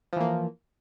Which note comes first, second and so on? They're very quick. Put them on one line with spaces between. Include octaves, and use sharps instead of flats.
F3 E3 A#3